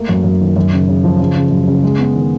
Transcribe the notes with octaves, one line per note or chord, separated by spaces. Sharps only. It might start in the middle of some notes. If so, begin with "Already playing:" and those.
Already playing: A3 A#3
F#2
F#2
D#3
F#2
C#3
C#3
F3
C#3
C#3
F#2
C#3
G#3
B3
D#3